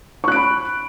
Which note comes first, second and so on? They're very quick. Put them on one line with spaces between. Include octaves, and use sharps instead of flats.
C#6 F#6 D7 B5